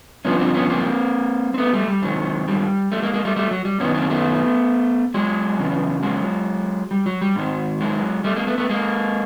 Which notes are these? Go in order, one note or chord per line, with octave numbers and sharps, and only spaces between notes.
G2 D3 F3 B3 C#4
C4 D4
B3 C#4
A#3 C4
C4
A3 B3
G3 A3
G3
G#2 D#3 F#3
G3
G3 A3
G#3 A#3
G#3 A#3
G3 A3
G3 A3
F#3
G3
F#2 D#3 B3 C#4
A#3 C4
A3 B3
F#3 G#3
E2 C#3 E3
F#3 G#3
G3
F#3
G3
G#2 D#3
F#3 G#3
G3 A3
G#3 A#3
A3 B3
A3 B3
G#3 A#3